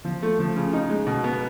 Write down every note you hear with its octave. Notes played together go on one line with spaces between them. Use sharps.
F3
A3
F3
C#3
D#4
G#3
B2
B3